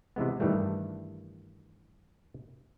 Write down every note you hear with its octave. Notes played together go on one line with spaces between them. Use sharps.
C3 E3 G#3 B3
G2 D#3 E3 G3 A3